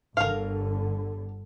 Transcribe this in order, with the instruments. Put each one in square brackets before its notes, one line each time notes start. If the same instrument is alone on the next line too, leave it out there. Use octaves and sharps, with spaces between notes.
[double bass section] G1 D3 [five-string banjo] A#4 F5